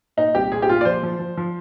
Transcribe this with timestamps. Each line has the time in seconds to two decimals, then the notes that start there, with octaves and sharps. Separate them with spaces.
0.17 A#2 D#4
0.35 C2 G4
0.52 A#2 G#4
0.62 G4
0.69 A#2 F4
0.81 D5
0.85 F3 C5
1.03 F3
1.19 F3
1.37 F3